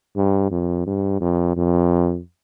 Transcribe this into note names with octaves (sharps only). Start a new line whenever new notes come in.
G2
F2
G2
F2
F2